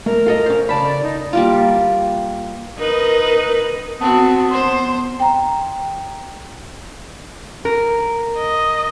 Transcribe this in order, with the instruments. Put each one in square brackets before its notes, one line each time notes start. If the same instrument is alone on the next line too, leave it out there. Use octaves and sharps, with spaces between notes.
[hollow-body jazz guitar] A3 [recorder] A#4
[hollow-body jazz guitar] F4 A4 D#5
C#4 C5
[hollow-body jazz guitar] C#3 A5 B5 [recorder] D5
[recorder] D#4
[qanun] G3 A#3 F4
[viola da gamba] D#4 B4 D#5 [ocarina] A#4
[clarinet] B3 [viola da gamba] C4 F#4 [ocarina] A5
[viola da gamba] C5 [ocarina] C6
[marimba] G5 A#5
[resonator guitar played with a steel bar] A#4
[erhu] D#5